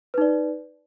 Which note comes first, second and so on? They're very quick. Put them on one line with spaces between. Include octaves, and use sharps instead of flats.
B4 D#4 D5